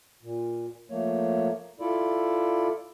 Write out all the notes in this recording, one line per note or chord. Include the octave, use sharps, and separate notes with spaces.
A#2
F3 A3 A#3 C#5
E4 F4 A4 D5